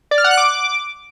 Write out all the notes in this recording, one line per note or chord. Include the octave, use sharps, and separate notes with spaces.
D5
F6
F#5
F#6
D6